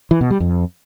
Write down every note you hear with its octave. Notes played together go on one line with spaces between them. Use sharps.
E3
B2
G3
F2